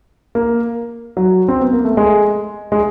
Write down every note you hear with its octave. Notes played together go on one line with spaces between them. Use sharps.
A#3
F#3
C4
B3
A#3
A3
G#3
G#3